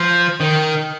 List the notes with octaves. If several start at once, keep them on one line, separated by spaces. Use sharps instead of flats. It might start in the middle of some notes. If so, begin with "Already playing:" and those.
Already playing: F3
D#3